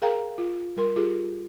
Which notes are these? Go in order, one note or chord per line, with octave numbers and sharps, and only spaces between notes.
G#4 A#4 F5 G5 A#5
F4
G3 A#4 C6
F4 G4 G#4